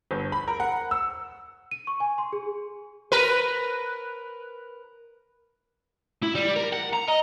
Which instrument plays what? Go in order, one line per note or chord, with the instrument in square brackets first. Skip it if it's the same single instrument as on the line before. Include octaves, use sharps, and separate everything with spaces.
[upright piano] G1
B5
A#4
F#5
E6
[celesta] D#7
C#6
G#5
C6
G#4
[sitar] A#4 B4
[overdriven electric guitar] E4
G3
A#4
F#5
A#5
D#5